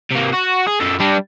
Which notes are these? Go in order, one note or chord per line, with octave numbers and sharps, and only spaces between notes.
C3 A#3
F#4
G#4
F#2 A4
G3 D4